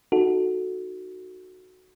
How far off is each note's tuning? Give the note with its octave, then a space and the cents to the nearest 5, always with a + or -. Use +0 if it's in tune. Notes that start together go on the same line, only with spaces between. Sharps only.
D#4 +0 F#4 +0 A4 +0